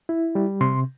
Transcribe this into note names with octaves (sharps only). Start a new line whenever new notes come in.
E4
G3
C3 C6